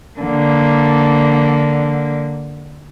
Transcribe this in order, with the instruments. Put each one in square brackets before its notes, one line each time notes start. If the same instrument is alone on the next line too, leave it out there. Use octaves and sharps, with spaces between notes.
[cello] D3 A#3